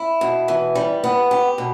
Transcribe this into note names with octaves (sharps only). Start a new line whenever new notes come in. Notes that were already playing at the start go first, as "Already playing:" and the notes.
Already playing: E4
B2
E3
G3
B3
G4
B2